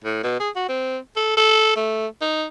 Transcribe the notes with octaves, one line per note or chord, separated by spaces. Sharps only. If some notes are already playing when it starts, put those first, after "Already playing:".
A2
B2
G#4
F#4
C4
A4
A4
A3
D#4